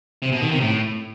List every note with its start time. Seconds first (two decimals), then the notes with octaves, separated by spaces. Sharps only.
0.22 C3
0.32 B2
0.42 D#3
0.51 C3
0.61 A2